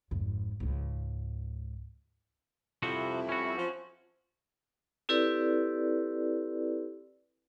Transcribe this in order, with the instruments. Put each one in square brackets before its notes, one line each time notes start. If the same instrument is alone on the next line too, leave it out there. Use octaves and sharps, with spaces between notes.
[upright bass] G#1 F2
C#2 G#2
[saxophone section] F2 G3 E4 [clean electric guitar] C3 F3 F#4
[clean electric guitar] C#4 F#4
[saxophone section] F3
[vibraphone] C4 E4 G4 A4 B4 D5